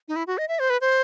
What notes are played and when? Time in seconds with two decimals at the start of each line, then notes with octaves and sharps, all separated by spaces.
0.08 D#4
0.16 E4
0.27 F#4
0.38 D#5
0.48 E5
0.59 C5
0.70 B4
0.81 C5